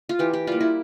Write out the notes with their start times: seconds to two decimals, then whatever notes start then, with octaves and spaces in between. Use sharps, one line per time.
0.09 F4
0.19 E3 G4
0.33 G4
0.47 G3 A#3 F4
0.61 E4